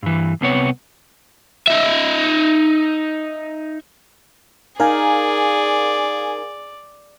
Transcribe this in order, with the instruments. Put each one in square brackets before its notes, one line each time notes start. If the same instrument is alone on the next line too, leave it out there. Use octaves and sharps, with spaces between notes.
[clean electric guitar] G2 E3
C2 C3 B3 C#5
[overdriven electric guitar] D#4 E5
[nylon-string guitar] D#4 [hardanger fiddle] G#4 [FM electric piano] A#4 F5 G#5 [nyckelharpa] D5